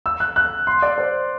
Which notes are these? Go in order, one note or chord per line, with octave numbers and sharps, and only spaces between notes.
E6
F#6
F#6
C6
D5
C5